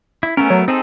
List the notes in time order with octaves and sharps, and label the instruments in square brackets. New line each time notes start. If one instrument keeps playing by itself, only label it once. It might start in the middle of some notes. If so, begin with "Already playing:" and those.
[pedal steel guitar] E4
[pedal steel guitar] A3 B3 A#4 [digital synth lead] C#4
[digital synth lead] F#3
[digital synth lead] C4 [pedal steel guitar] D#4 G#4 A4